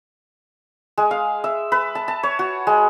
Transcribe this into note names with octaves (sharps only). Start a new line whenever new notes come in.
G#3
F5
E5
B4
A5
A5
C#5
F#4
G#3